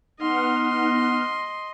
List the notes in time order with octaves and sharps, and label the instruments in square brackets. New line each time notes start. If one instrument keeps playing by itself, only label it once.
[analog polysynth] B3 F#5 F6 [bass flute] D#4 [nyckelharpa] D#5 C6